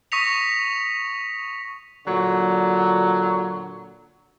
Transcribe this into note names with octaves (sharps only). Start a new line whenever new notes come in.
C#6 D#6 A#6 B6 C#7 F7
A#2 D3 F#3